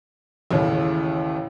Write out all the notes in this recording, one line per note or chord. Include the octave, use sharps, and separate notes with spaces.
A1 D#2 A2 C#3